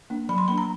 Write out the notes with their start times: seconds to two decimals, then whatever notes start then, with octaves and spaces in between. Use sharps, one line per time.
0.10 A#3 D4
0.29 F#3 B5
0.38 C6
0.48 A#3 D4 B5
0.58 A#5